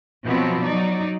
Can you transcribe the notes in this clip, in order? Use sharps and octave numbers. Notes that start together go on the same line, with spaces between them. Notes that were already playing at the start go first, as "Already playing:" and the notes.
B2 F3 F#3 B3 C4
F#3 D#4 D5